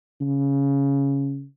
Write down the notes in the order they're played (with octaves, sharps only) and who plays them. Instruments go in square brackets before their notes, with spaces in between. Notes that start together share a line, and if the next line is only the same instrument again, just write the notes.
[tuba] C#3